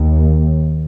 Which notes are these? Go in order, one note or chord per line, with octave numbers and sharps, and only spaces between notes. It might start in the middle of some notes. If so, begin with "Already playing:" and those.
Already playing: D#2